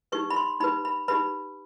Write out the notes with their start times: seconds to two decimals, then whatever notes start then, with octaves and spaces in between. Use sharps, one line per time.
0.12 D#4 G4 B4 C#6
0.30 B5
0.36 C6
0.60 D#4 G4 B4 B5
0.85 B5
1.08 D#4 G4 B4 B5